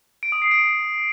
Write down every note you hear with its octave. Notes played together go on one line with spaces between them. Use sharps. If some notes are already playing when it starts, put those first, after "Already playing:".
D7
D#6
C7
D7